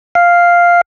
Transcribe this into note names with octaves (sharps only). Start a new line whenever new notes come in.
F5